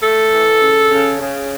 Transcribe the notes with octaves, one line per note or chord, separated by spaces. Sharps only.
A3 A4
E3
C#3
C#3
C#3